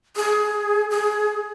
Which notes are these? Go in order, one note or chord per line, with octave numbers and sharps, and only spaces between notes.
G#4
G#4